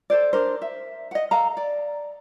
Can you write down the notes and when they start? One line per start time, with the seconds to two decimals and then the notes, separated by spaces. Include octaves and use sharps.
0.10 A4 C5 D5
0.33 D4 A#4 C5
0.62 E5
1.11 D#5 F#5
1.31 A4 F5 A#5
1.57 D5